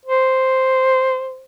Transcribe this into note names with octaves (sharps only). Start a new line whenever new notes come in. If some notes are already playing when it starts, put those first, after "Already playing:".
C5